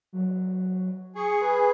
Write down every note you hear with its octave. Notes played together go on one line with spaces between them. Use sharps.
F#3
G#4 C#6
B4